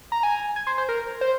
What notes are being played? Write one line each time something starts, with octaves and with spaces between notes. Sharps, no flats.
A#5
G#5
G#5
C5
C5
A#4
C5